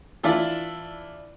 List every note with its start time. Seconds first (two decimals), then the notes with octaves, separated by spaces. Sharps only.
0.23 E3 D4 E4 F4 D5